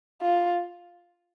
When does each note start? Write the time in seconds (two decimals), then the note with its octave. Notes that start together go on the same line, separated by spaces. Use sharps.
0.22 F4